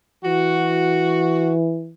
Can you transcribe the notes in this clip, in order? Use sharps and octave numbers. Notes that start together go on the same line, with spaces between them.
E3 F#4